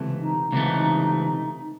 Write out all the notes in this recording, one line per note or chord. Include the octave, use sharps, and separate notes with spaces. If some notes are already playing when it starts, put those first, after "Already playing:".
Already playing: C#2 C3 E3 A3
D#4
C#2 C3 E3 A3